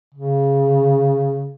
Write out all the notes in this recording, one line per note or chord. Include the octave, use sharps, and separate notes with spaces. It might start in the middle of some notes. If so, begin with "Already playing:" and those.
C#3